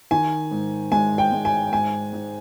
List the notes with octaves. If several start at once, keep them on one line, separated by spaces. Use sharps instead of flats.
D#3 G#5
G#2
G#3 G#5
G5
G#3
G#5
G#2 G#5
G#2